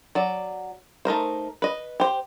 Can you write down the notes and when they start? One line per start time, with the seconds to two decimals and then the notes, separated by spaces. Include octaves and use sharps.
0.15 F#3 D5
1.05 A3 D#4 A#4 C5
1.62 B4 D#5
2.00 G4 C5